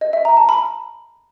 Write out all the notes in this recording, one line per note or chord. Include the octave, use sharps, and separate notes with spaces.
D#5
E5
A#5
A5
B5